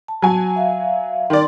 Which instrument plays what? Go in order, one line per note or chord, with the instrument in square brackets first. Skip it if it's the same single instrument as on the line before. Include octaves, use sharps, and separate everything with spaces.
[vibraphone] A5
[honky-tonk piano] F#3 G#5
[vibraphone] E5 F5
[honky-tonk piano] D#3 D5 [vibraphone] C6